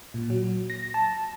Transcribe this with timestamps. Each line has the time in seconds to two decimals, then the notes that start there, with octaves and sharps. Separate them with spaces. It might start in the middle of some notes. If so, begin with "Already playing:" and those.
0.14 A#2
0.30 F#3
0.70 A#6
0.94 A5